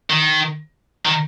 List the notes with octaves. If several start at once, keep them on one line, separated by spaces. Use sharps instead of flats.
D#3
D#3